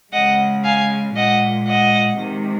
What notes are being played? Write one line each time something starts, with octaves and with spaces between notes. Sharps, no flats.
C#3 G#3 D#5 F#5
F5 G#5
A#2 G#3 D#5 F#5
D#5 F#5
C3 D#3 G#3